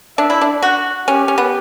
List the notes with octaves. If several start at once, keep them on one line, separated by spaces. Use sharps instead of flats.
D4 E5
E4
D4
F#4 F#5
C#4 G4
C#4
B3